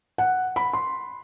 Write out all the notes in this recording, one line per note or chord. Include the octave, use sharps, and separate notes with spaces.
F#5
B5
C6